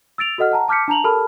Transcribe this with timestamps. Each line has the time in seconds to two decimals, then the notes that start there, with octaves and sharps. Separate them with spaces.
0.18 E6 A6 D7 F7
0.38 F#4 A4 D#5 F#5 F6
0.51 F#5 A5 A#5
0.68 A5 D6 F6 G6 B6 C#7
0.88 D4 A5 A#5 F7 F#7
1.04 G4 A4 A#4 A5 B5 F6